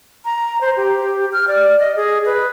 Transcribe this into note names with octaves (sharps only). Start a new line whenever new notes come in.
A#5
C5
G4
F6
D5
D#5
G#4
B4